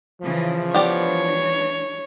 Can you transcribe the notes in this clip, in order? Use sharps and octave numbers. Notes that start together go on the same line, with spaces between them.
C#3 E3 F3
E3 B3 D4 G4 C#5 D5